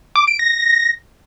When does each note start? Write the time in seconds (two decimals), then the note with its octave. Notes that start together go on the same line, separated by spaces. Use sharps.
0.16 D6
0.27 D7
0.39 A#6